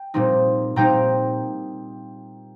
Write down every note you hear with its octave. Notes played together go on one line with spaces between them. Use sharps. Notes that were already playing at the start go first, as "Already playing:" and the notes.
Already playing: G5
A#2 G3 C4 D#4
A#2 G3 C4 D#4 G5 A#5